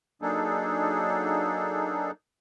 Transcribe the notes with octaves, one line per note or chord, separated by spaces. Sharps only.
F#3 A#3 D4 D#4 G#4 A4